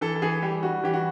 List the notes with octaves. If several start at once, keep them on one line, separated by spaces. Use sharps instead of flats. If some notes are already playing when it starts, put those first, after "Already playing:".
E3 A4
A4
E3 G#4
G3 G4
G3 F#4
E3 G4
F#4